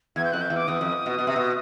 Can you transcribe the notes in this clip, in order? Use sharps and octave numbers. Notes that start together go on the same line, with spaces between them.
E2 G#6
G6
F2 F#6
G6
E2
D6
E2 D#6
F2
B2
B2
C3
B2